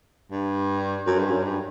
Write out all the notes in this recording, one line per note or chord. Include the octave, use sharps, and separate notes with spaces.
G2
F#2
G2
F#2
G2